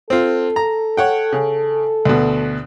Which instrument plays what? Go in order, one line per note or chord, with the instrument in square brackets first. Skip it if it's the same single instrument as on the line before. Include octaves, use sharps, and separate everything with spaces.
[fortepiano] C4 F4 [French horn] A4
[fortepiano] A#5
C#5 F#5 G5
C#3
D2 B2